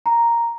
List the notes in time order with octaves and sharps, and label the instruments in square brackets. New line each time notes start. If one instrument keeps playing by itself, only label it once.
[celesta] A#5